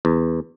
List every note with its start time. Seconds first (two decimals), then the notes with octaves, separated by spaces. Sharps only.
0.05 E2